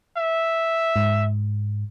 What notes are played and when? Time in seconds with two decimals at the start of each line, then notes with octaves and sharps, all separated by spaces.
0.18 E5
0.96 G#2